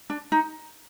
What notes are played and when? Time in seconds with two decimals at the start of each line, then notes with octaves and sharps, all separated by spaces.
0.10 D4
0.32 D#4